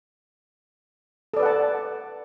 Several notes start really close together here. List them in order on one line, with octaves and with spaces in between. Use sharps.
A4 D5 B4 F#5 A5